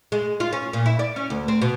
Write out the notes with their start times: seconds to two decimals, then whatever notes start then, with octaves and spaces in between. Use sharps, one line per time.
0.12 G#3
0.40 F4
0.53 C#4
0.73 A#2
0.86 E4
0.99 D5
1.16 C#4
1.30 D2
1.48 C4
1.62 B2